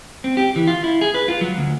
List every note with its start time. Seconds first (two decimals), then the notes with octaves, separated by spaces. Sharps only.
0.24 C4
0.37 G4
0.56 E3
0.67 F4
0.84 E4
1.01 G#4
1.14 B4
1.28 F4
1.41 F#3
1.58 D2